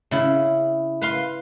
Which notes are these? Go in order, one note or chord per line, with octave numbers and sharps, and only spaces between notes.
C#3 E4
B4 F5 C6